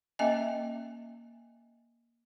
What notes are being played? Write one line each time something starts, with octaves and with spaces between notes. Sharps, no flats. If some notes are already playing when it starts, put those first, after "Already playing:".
A#3 C#4 D#5 E5 G#5